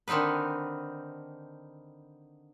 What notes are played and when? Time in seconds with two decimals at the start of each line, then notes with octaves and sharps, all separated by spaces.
0.08 D3 D#3 C4 D#4 B4